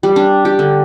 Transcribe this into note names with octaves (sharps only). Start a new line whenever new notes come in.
G3
D4
G4
D3